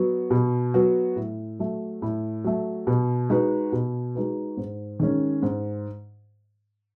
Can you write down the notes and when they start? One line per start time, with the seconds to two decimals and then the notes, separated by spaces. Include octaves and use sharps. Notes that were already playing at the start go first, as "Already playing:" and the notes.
Already playing: F#3 B3 F#4
0.31 B2
0.74 F#3 B3 F#4
1.16 A2
1.59 F#3 A3
2.02 A2
2.44 F#3 A3
2.87 B2
3.29 G#3 D#4 F#4 B4
3.72 B2
4.15 G#3 D#4 F#4 B4
4.57 G#2
5.00 D#3 G#3 C#4
5.42 G#2